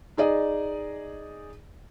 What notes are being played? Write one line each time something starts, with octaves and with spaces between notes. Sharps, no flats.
D#4 G#4 D5 D#5